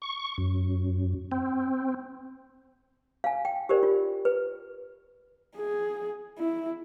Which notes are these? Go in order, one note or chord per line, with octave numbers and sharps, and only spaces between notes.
C#6
F#2
C4
F5 G#5
G5
G4 A#4 C5 D5
F4
B4
G#4
E4